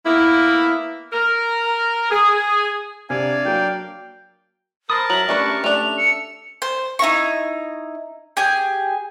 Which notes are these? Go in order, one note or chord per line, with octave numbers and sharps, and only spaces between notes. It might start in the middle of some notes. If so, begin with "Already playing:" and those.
A#3 B3 E4
A#4
G#4
C3 D4 D5 F5 G#5
F#3 A#3 G5
A#4 C5 A5 B5 D#6
F#3 E5 A#5 F#7
A3 C#4 D4 G4 B4 C#6
A3 D4 F7
E6 C#7
C5
D#4 E4 A#5 C#6
G4 G#4 G#5